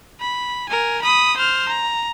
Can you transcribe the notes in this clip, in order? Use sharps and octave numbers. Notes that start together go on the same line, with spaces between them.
B5
A#4 G#5
B5 D#6
C5 F6
A#5